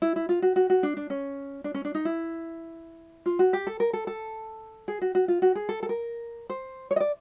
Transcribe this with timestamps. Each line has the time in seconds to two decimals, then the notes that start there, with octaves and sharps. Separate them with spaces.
0.02 E4
0.16 E4
0.29 F4
0.42 F#4
0.56 F#4
0.70 F#4
0.83 D4
0.97 D4
1.10 C#4
1.64 D4
1.74 C#4
1.85 D4
1.95 D#4
2.05 E4
3.26 F4
3.39 F#4
3.53 G4
3.67 A4
3.80 A#4
3.93 A4
4.07 A4
4.88 G#4
5.02 F#4
5.15 F#4
5.28 F4
5.42 F#4
5.55 G#4
5.69 A4
5.83 A4
5.89 A#4
6.50 C5
6.91 C#5
6.96 D#5
7.00 D5